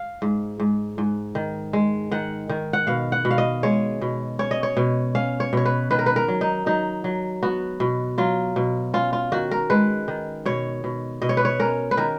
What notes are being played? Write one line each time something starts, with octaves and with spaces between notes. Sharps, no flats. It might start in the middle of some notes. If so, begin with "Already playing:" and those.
Already playing: F5
G#2
G#2
G#2
D#3
G#3
D#3 F#5
D#3
F#5
B2 F5
F#5
B2
F5
D#5
G#3 C#5
B2
C#4 C#5
D#5
C#5
B2
C#4 F5
C#5
B2 C#5
B4
D#3 B4
A#4
B4
A#4
F#3
D#4
F#3 D#4
F#3
B3 F#4
B2
F#3 F4
B2
C#4 F4
F4
D#3 F#4
A#4
G#3 B4
D#3
B2 C#5
B2
B2 D#5
C#5
B4
C#5
C#4 A#4
B4
D#3 A#4